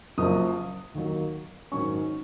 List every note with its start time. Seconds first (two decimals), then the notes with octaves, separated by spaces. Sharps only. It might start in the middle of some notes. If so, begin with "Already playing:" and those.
0.18 F#1 F#2 F3 A#3 D#6
0.94 D#2 D#3 F#3
1.72 G#2 D#3 F#3 C#4 C#6